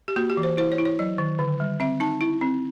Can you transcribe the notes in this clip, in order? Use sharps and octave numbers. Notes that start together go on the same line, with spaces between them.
G4
A#3 F#4
G4
E3
C5
E4 C5
C#5
E4
C#5
F#3 D5
D#3
D3
G3
C4 E5
D#4 A5
E4
C4